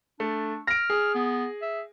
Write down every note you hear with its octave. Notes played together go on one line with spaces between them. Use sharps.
A3 D4
F6 A#6 D7
G#4
B3
E5